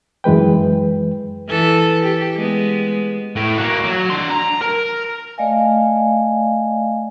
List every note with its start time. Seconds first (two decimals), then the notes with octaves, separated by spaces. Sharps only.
0.24 F#2 E3 G#3 B4 G5
1.48 E3 A4
2.03 G4
2.37 G#3 B3
3.36 A2
3.58 A#3 F#4
3.85 F#3
4.10 D4 C6
4.30 A#5
4.61 A#4
5.38 A3 D5 D#5 F5 G#5